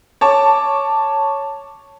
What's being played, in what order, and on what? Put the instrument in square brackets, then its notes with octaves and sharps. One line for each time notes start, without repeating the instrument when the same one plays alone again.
[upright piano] C#5 A5 D6